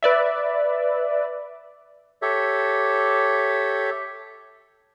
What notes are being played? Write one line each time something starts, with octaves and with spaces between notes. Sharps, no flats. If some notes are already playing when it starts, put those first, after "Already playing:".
B4 D5 E5
G4 A4 C#5 E5